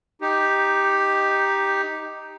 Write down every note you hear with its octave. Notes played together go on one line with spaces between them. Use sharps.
D#4 G4